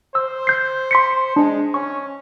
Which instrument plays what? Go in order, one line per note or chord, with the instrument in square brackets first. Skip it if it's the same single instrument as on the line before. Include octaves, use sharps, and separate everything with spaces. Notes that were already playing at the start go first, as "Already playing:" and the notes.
[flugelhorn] C5 [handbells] E6
[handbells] G6 C7
C6 B6 C#7
[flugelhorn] G#3 [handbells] D4
[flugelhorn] C#4 [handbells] C#6